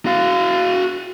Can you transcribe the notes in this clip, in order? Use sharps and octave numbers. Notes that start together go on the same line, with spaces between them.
F#4 F5